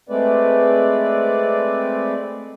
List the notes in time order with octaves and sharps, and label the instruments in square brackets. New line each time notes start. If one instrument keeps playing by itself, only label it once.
[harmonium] G#3 A3 C4 B4 D5